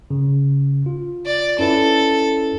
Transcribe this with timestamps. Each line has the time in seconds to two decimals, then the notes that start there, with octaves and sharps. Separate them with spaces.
0.10 C#3
0.86 F4
1.26 D5
1.59 C#4 E4 A4 B4